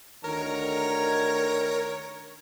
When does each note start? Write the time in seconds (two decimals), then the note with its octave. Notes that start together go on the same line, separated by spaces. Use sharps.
0.24 D2 D3 D#3 A#4 C#5 A#5